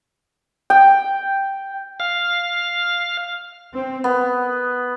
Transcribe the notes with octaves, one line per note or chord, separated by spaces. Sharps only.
G5
F5
C4
B3